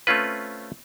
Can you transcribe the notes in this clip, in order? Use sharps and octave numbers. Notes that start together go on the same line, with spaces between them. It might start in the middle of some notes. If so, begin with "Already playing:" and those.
A3 C4 C#4 F4 B4